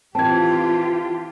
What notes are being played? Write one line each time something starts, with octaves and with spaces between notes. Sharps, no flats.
E3 C4 F4 G4 A5 G#6